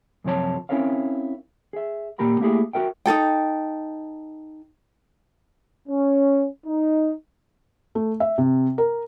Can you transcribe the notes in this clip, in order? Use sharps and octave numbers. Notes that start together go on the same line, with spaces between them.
F#2 C3 F3 C#5 A5
C4 C#4 E4 A#4 C#5 F5
G#4 E5
A#2 A#3 G4 A#4 B5
A3 A#3 D4 E4 G4 G#4
F#4 G4 A#4 E5 G5
D#4 F4 A4 G5
C#4
D#4
A3
E5
C3
A#4